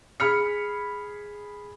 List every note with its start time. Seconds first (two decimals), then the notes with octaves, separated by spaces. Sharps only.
0.20 G#4 B5 F6 C#7